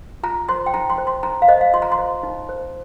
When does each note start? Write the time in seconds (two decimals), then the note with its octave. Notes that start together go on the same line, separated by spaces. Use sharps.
0.23 F4 A#5
0.49 C5 C6
0.66 G5
0.74 D#4 A#5
0.90 C6
0.98 C5
1.07 C6
1.23 D#4 A#5
1.42 F5
1.48 C5 D#5
1.61 F5
1.73 F4 C6
1.82 A#5
1.92 C6
1.98 C5
2.23 D#4
2.49 C5